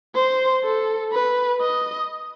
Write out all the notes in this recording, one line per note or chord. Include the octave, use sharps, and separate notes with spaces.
C5
A4
B4
D#5